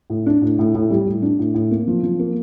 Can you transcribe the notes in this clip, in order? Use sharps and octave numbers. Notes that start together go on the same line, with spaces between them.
A2
D4
A2
A2
A2
G3
A2
D4
A2
A2
A#3
F3
F3
A#3